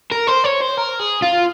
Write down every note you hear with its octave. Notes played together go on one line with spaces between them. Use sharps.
A#4
C5
C#5
C5
A#4
G#4
F4